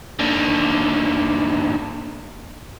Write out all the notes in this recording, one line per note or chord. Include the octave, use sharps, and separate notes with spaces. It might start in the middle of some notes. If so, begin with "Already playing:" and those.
D#2 D3